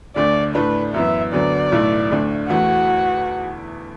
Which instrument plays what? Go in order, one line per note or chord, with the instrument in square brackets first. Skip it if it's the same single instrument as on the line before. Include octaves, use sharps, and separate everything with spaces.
[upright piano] D2 D3 A3 [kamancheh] D5
[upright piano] A2 A3 D4 [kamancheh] B4
[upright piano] F#2 E3 B3 [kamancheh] E5
[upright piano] D2 D3 F#3 B3 [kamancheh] D5
[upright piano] B1 A2 A3 E4
D2 D3 A3 D4
[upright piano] E2 E3 A3 [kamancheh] F#4